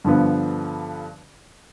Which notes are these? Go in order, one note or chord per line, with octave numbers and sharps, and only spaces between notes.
G2 D3 F3 B3